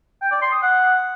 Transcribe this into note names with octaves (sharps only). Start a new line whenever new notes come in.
G5
D5
C6
D#6
F#5